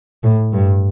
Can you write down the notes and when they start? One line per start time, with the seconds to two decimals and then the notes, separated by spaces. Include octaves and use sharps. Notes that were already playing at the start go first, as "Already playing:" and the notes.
0.24 A2
0.53 G2